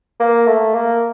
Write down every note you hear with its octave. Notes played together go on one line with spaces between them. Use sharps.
A#3
A3
A#3